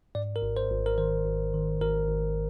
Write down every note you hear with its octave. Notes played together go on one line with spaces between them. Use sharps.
G#2 D5
A#4
G#1
C5
G#1
A#4
D#3 C5
G#1
D#3
G#1 A#4
G#1